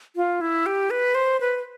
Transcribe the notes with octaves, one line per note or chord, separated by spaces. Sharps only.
F4
E4
G4
B4
C5
B4